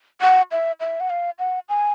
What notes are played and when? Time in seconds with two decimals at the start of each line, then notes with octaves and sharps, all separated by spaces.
0.21 F#5
0.52 E5
0.80 E5
1.00 F#5
1.10 F5
1.39 F#5
1.69 G#5